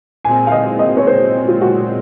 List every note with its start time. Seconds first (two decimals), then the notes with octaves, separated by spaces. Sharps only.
0.25 A#2 G#3 C4 G#5
0.47 F5
0.52 D#5
0.79 D#5
0.97 C#5
1.07 C5
1.48 F4
1.61 F#4